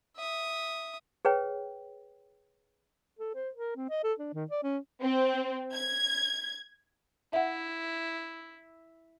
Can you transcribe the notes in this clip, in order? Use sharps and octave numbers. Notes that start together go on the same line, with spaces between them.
E5 D#6
G#4 B4 C#5 G5
A4
C5
A#4
C4
D#5
A4
D4
D#3
D5
C#4
C4
G#6
E4 E5 F#5